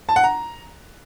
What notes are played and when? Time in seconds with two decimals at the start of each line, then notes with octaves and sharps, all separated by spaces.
0.09 A5
0.16 F#5
0.24 A#5